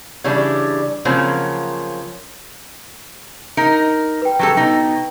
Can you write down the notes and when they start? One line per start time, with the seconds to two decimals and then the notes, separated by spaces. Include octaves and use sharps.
0.24 C#3 E3 G3 D4
1.05 C#3 F3 F#3 A#3 C4
3.57 D#4 A#4
4.22 B4 G5
4.39 F#3 G3 A4
4.57 B2 D#4